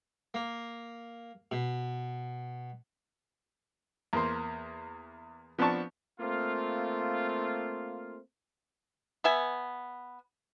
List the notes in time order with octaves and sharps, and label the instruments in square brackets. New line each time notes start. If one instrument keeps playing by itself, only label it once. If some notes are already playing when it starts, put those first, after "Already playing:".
[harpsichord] A#3
B2
[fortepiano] E2 A#3 C5
F3 B3 C4 D4 A5 C#6
[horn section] A3 A#3 C4 F4
[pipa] B3 E5 G#5